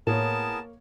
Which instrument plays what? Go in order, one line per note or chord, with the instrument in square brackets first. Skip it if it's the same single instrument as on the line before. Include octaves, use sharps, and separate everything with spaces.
[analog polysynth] A2 [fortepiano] A#3 C#5 [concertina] B3 G#4 A#4 [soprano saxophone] A5